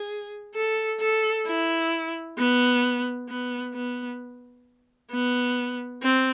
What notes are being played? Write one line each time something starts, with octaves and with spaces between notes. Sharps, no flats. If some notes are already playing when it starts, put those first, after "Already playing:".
Already playing: G#4
A4
A4
E4
B3
B3
B3
B3
C4